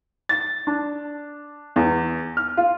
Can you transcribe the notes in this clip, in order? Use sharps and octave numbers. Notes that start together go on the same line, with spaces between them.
A6
D4
E2
F6
F4